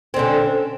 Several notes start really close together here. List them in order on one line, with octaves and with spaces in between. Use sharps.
C4 D3 C#4